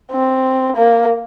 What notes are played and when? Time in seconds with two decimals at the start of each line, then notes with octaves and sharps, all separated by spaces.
0.12 C4
0.77 A#3